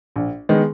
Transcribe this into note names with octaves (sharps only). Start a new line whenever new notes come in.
A#1
D#3 G#3 B3